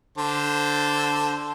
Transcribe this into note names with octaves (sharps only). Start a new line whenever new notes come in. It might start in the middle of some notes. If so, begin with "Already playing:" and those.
D3 C5 A5